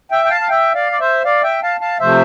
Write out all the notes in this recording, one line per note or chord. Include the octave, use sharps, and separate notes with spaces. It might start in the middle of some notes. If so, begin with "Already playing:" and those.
E5 G5
G5
F5 A5
F5
E5 G5
D5 F5
D5
C5 E5
D5 F5
E5 G5
F5 A5
F5 A5
C3 F3 A3 C5 E5